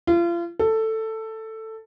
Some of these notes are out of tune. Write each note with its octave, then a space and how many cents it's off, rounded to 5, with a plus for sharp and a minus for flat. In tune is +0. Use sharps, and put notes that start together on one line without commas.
F4 -35
A4 +10